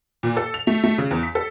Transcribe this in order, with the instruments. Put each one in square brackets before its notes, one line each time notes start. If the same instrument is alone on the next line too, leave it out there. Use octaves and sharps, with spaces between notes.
[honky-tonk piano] A#2
A4
F7
A3
A3
C#3
E2
B6
A4